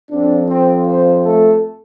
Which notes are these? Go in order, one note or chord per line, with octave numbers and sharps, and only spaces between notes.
F2 F3 C4 D4
C4
C4 C5
A3 A4